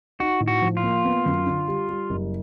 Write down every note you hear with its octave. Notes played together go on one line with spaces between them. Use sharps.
D#4 F#4
A2
F#4
F3
F4
A#3
B3
F#2
D3
G3
G3
F#1